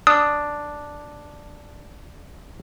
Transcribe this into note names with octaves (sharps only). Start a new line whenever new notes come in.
D4 D#6